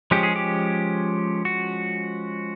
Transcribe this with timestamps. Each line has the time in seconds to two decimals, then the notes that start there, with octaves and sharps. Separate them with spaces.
0.11 F3 G#3 C#4 G4
0.23 G#4
0.36 G4
1.45 F#4